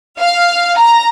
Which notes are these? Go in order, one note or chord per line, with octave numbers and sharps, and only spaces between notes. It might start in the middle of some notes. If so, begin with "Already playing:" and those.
F5
A#5